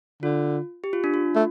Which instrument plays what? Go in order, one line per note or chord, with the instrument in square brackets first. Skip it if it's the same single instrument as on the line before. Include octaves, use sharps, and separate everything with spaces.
[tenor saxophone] D3 [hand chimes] F4
[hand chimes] G4
F4
D4
F4
[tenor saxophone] A3